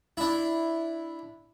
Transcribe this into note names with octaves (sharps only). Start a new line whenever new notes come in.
D4 E4